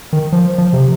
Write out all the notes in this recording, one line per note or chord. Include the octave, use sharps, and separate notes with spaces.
D#3
F3
F3
C3